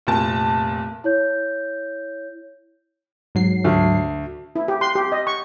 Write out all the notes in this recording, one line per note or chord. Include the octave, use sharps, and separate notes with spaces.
F1 A#2 A5
E4 C#5 G6
G#2 F#3 C7
D2
E4
G4
C6
G4
D#5
C#6